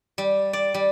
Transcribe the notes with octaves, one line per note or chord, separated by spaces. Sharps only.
G3
D5
G3